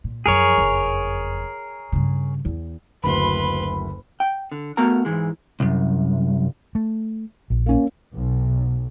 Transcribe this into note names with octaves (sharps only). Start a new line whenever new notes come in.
A#2
F#2 F3 G#4 A#4 C#5
F#1 F2
G2 C#3
E2
F#1 D2 B4 B5 C6
G5
D3
A3 B3 F#4 A#4 A#5
G#2 E3 G#3
C2 F#2
A3
A#1
A#3 C#4
B1